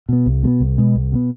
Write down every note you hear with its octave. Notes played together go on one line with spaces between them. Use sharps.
B2 B3
C2
B2 G#3 B3
C2
B2 G#3 B3
C2
B2 G#3 B3